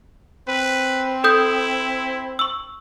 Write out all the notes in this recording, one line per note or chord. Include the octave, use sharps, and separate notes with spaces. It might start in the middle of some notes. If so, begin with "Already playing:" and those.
C4 B4
E4 A4 D#6 G6
C#6 E6